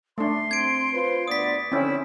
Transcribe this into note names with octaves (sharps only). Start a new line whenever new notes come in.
A3 D4 C6
C4 G#6 D7
F4 B4 C5
D2 B3 D5 D#6 B6
D3 C4 C#4 E4